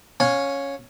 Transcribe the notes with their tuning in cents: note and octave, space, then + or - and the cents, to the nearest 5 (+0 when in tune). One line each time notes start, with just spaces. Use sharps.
C#4 +0 F5 +30 G#5 +0